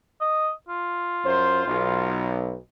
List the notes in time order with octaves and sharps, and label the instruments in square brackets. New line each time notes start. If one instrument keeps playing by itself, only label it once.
[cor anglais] D#5
F4
[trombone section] F#2 C5
B1